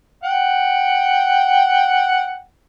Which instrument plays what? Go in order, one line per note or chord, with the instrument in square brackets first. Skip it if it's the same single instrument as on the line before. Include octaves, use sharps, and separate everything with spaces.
[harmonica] F#5 G5